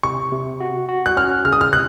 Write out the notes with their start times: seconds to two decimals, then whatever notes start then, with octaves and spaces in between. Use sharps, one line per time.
0.03 C3 C#6
0.32 C3
0.60 F#4
0.89 F#4
1.06 F#6
1.17 C#4 F6
1.45 C#3 F6
1.52 D#6
1.61 F6
1.73 C3 F#6